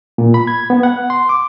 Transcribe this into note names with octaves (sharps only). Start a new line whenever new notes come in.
A#2
B5
G#6
B3
F#5
C6
D6